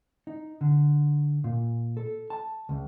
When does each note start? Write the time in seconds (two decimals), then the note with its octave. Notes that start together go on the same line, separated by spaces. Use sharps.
0.27 D#4
0.61 D3
1.44 A#2
1.97 A4
2.30 A5
2.69 C#2